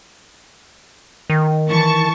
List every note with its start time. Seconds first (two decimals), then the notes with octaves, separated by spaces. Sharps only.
1.30 D#3
1.69 E3 A5 C#6